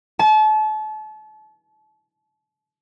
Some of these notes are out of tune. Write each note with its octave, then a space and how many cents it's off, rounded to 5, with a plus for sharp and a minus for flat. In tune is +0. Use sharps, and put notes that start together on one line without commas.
A5 -35